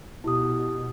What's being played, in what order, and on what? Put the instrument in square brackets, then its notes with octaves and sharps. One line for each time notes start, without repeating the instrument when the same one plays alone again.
[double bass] B2 [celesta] E4 G4 D#6